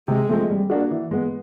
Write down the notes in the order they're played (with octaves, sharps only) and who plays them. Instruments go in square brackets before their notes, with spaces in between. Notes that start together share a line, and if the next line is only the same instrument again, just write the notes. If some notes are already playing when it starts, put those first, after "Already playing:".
[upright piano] C3 [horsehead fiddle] G#3
[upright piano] F3 A3 C4
G3
A#3 D4 F#4
E3
G#3 B3